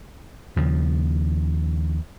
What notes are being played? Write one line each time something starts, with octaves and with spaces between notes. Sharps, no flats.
D#2 C#3 F3